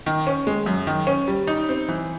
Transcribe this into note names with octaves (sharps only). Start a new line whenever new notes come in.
D#3
C#4
G#3
F#2
D#3
C#4
G3
D#4
C4
E3